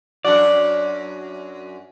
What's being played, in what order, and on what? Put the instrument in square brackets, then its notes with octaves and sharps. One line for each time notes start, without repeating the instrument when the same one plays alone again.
[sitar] F#2 D4 F#4 [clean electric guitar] D5